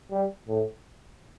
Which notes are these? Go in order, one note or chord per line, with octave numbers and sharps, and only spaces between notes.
G3
A2